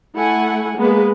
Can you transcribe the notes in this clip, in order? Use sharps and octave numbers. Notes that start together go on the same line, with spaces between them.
A3 E4 F#5 G#5
G#3 A#3 B3 G#4 B4